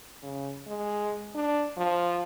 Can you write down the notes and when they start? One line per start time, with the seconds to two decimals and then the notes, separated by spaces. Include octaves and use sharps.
0.23 C#3
0.67 G#3
1.35 D4
1.77 F3